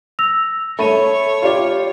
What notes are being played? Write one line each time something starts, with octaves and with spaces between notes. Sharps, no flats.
E6 A#6 F7
A3 C#5 B5 D#7
F4 G4 D5